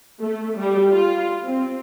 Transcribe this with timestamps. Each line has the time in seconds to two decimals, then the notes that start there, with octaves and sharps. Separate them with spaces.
0.22 A3
0.58 G3
0.91 F4
1.46 C4